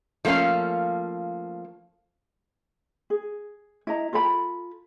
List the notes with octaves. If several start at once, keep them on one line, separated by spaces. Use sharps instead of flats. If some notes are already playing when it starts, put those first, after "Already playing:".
F3 A3 A#3 C#4 F5
G#4
E4 D#5 A#5
F4 A4 A#5 B5